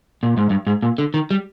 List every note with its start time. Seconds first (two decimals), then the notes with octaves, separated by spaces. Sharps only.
0.23 A#2
0.37 G#2
0.50 G2
0.67 G#2
0.83 A#2
0.98 D3
1.14 D#3
1.31 G3